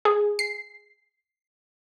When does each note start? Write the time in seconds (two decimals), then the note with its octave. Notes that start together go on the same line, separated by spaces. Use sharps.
0.05 G#4
0.39 C7